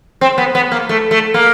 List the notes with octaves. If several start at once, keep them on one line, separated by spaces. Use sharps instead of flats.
C4
B3
B3
A#3
A3
A3
A#3